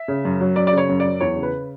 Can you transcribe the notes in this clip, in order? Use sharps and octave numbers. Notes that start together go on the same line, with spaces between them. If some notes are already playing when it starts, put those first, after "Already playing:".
Already playing: E5
C#3
F#2
F#3
F#2 D5
D5
C#3 C#5
F#2
F#3 D5
E2 C#5
C#3
B4